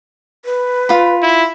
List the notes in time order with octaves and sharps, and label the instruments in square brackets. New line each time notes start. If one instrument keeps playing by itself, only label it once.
[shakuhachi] B4
[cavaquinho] F4 B5
[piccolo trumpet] E4